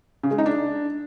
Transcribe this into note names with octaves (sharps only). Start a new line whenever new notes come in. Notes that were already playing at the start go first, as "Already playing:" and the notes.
C#3
G#3
D#4
D4